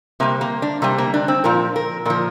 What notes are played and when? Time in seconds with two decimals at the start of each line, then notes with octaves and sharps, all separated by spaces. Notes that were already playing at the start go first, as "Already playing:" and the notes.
0.20 C3 G3 A#3
0.41 A#3
0.62 D4
0.82 C3 G3 A#3
0.98 A#3
1.14 D4
1.28 C4
1.44 A#2 F3 A#4
1.76 A#4
2.05 A#2 F3 A#4